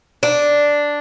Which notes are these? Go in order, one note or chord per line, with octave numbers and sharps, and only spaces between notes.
D4